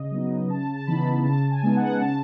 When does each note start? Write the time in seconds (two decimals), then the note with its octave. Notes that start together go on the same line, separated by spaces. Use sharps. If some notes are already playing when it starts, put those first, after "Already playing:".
Already playing: C#3 D#5
0.11 F#3 B3 D#4
0.49 C#3 A5
0.76 A5
0.87 E3 B3 D#4 B5
1.25 C#3 A5
1.51 G#5
1.63 G#3 B3 D#4
1.77 F#5
2.01 C#3 A5